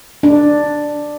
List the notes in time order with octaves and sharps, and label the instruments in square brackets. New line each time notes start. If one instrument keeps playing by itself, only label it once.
[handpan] D4